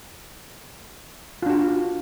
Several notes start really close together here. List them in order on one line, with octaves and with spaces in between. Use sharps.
F4 D4 F#4